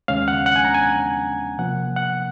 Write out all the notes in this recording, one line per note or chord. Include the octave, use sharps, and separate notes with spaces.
D#2 C#3 G#3 C#4 F5
F#5
F#5
G#5
A#5
G#5
C3 F3 A#3 F#5
F#5